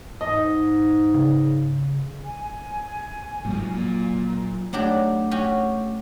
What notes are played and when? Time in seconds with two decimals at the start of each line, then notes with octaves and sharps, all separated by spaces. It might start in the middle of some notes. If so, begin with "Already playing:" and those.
0.21 G#2 D#5
1.14 C#3
2.24 G#5
3.45 G#2 F3 F#3
3.74 A#2
4.73 F#3 A3 D4 G4 D6
5.31 C#4 F#4 G4